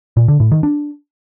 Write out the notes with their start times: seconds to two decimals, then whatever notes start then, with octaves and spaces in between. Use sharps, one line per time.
0.17 A#2
0.28 D3
0.40 A2
0.52 D#3
0.63 D4